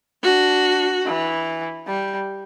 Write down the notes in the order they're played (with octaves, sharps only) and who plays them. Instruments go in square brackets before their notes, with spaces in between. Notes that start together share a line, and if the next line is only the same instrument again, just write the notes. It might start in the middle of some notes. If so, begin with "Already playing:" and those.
[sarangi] D4 [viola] F#4
[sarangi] E3
G3